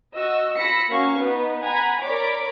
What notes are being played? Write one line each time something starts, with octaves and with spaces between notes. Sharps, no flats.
F#4 D#5 E6
F4 B5 E6 A#6 B6 C#7
A#3 C#4 F#4 F5 C#6
B3 D#4 B4
F#5 G#5 A#5 B5
A#4 C#5 D5 B5 D6